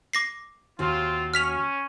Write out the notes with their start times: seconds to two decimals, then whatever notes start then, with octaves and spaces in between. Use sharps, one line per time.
0.13 D6 A#6 C7
0.79 D#2 C4 F4 F#4
1.34 C#4 F6 B6 F7